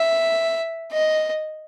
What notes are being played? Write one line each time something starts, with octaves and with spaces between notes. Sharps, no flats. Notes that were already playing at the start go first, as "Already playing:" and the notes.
Already playing: E5
D#5